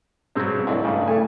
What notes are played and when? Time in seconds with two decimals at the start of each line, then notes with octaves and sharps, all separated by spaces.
0.35 G2 B2 F#3 G#3 C4
0.67 C#2 G#2 A3 D4 E4
0.84 G2 C#3
1.08 A3 G#5